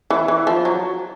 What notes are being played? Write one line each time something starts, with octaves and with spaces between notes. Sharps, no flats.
E3
E3
F3
F#3